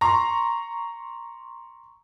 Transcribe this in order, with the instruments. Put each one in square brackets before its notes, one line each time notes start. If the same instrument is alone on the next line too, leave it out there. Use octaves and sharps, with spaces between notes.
[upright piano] A#5 C6 C#6